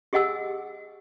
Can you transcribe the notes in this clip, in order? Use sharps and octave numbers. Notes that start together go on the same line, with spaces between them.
G4 G#4 D#5 F#5 G#5 E6